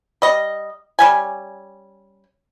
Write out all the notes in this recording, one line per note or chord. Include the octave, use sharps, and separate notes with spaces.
G3 D#5
G3 C#4 G#5